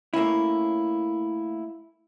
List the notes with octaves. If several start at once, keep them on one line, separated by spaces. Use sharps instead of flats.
A3 A#3 C#4 E4